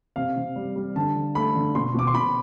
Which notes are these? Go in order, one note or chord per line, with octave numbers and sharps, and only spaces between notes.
C3 F5
C3
G3
G3
D3 A5
D3
A3 B5
D3
B2 C6
B2 D6
C6
B2 B5